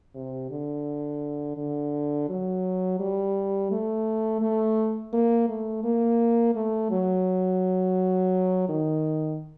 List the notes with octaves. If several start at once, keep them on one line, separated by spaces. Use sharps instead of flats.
C3
D3
D3
F#3
G3
A3
A3
A#3
A3
A#3
A3
F#3
D#3